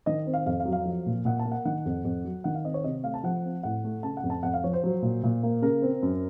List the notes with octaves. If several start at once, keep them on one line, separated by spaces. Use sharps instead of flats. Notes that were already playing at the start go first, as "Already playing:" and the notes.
D#3 D#5
C4
F5
F2 F5
F5
F#3
F5
F3
A#2
A#2 F#5
A5
A#3
F#5
D#3 F#5
F2
F2
F#3
D#3 F#5
F5
C4 D#5
C#5
C3 D#5
A3 F5
A5
F3 F#5
C4
A2 F#5
A3
C#3 A5
F#5
F2
A5
F2 F#5
F5
F3 C#5
C5
F#3
A#2
A#2
A#3
C#3 A#4
C4
F#2